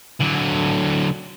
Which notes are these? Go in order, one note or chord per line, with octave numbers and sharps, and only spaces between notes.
D3 F#3